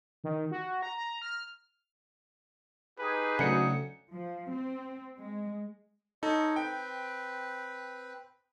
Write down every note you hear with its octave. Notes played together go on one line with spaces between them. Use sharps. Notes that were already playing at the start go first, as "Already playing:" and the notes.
D#3
F#4
A#5
A#5
F6
D#4 G4 G#4 B4
D2 C#3 F#3 C#7
F3
C4
G#3
D#4 A4 C#5 D#5
C4 B4 G5